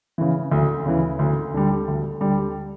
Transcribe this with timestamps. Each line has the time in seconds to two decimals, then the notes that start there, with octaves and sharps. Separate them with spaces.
0.18 C#3 E3
0.52 D2
0.86 C#3 E3
1.19 D2
1.54 D3 G3
1.88 D2
2.21 D3 G3